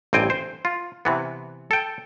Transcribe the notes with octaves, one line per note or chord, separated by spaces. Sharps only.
A1 G2 C4 G5 G#5
C5
F4
C3 E3 B3
A4 G5